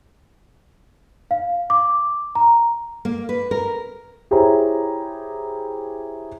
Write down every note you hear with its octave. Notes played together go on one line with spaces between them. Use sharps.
F5
D6
A#5
A#3
B4
A#4
E4 G4 G#4 C5 C#5 A#5